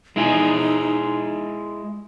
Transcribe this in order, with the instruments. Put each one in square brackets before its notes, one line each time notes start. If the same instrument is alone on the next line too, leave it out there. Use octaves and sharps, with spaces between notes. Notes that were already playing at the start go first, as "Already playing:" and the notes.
[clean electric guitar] G#3 E4 G#4 [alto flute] D#4